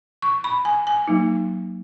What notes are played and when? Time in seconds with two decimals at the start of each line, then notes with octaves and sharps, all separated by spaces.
0.22 C#6
0.44 B5
0.65 G#5
0.87 G#5
1.08 F#3 A#3 D#4